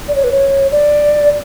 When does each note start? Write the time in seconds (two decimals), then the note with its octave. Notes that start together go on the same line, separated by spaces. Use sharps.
0.08 D5
0.16 C#5
0.24 B4
0.32 C#5
0.72 D5